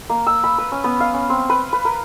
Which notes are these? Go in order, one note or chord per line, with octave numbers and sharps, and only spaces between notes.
A#3
E6
B5
B4
C#4
B3
F5
C#4
C4
B4
B4
A#4